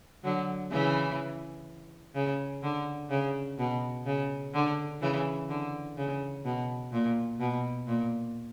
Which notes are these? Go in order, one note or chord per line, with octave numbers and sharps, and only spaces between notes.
D3 F#3
C#3 E3
C#3
D3
C#3
B2
C#3
D3
C#3 E3
D3
C#3
B2
A#2
B2
A#2